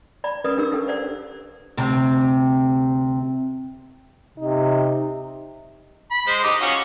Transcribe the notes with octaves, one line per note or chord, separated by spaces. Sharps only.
D5 B5
C#4 A#4 B4 D5 D#6
D4 G4 A#4 E6
G4 A4 F#5
C5 D5 F#5
D2 C3
C3 D#4
B5
G#3 C5
D#4 G4
C#4 F4 F#4